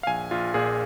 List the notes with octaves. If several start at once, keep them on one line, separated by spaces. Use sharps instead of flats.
F5
A#1 G#5
A#1 F4
A#2 G#4